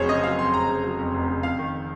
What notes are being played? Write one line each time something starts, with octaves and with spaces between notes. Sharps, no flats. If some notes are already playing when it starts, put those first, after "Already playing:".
Already playing: F1 F2 F#3 G#4 C5 C#5
C#3 D#5
F#3 F5
F2 C6
F1 A#5
C#3
F#3
F2
F1
C#3
F2 F5
D#3